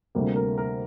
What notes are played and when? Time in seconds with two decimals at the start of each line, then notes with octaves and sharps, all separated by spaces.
0.15 D2 C3 G3 A#3
0.36 A#4
0.58 A#4